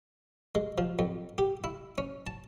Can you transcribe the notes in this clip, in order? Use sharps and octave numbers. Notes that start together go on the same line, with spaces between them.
G#3
F3
F2
G4
E4
C#4
A5